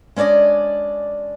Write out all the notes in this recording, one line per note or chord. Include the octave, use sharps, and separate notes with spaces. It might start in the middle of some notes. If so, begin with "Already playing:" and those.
G#3 C#4 D4 D5 D#5